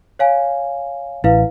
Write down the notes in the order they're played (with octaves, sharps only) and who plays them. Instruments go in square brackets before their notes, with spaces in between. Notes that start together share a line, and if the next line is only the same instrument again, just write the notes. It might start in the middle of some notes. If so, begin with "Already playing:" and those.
[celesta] C#5 F5 G#5
[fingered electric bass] A1 [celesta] E4 B4 F5